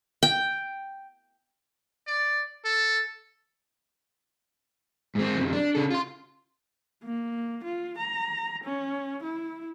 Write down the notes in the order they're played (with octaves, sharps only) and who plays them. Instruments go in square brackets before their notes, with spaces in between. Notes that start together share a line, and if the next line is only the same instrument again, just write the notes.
[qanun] G5
[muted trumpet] D5
A4
[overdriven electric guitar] G#2 C4
F#2 C3
D4
C#3 A4
F4 C6
[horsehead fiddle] A#3
F4
A#5
C#4
E4